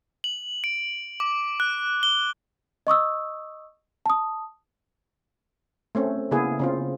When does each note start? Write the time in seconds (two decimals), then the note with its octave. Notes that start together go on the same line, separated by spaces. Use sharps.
0.24 F#7
0.64 D7
1.20 D6
1.60 F#6
2.03 G7
2.87 D#5 C#6 D#6 E6
4.06 A5 D#6
5.95 A3 C4 C#4
6.31 C#3 A#3 B3 E4 G#4
6.59 C#3 C4 F4